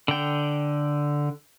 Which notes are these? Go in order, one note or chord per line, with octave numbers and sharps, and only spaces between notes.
D3 G5